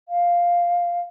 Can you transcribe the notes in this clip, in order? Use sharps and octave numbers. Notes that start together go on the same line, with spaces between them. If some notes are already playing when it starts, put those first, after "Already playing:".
F5